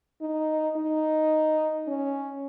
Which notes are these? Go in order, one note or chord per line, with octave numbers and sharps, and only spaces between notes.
D#4
D#4
C#4